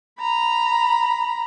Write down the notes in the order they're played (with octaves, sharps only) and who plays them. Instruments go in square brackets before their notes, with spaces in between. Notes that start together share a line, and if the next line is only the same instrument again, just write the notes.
[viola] A#5 B5